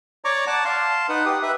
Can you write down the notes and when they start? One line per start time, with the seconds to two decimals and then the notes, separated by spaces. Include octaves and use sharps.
0.25 C#5 D5 A#5 C#6 D6
0.47 D5 F#5 A5 D6
0.65 F5 A5 C6
1.09 D#4 B4 F#5
1.25 G4 D#6
1.43 B4 E5